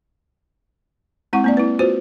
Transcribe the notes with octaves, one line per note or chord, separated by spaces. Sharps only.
G#3 C4 E4 F#5 C#6
A#3 C4 D5
E4 B4
F4 F#4 B4 C5